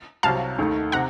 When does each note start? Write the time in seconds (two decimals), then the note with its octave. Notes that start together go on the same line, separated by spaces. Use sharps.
0.23 C2 C3 F#3 F5 A5
0.58 D#2 D#3 A3
0.92 C3 F#5 A#5